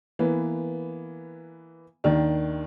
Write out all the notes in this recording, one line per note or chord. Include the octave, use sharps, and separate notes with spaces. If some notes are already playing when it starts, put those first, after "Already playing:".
E3 A#3 B3
D#2 D#3 D4